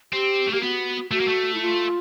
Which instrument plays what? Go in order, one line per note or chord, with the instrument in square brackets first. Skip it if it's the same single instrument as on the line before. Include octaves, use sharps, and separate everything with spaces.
[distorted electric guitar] C4 [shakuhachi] G4
[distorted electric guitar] A3
[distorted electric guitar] A#3 [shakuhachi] G4
[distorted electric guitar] B3 [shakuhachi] F#4
[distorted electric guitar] A3 [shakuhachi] F#4
[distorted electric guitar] A#3
A3
[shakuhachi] E4
F4